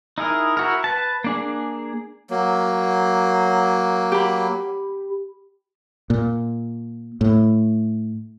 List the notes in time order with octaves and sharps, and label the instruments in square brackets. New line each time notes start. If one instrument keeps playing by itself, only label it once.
[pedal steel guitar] D#4 E4 G#4 A#4
E4 F#4 A#4
B4 A5
A#3 D4 G#4
[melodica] F#3 A#3
[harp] G4 B5
[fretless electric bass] A#2
A2